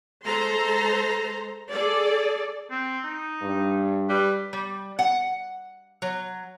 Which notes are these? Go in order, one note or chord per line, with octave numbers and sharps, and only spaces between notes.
G#3 A4 C5 A#5 C6
G#4 A4 D5
C4
D#4
G2
G3 B4
G3
F#5
F#3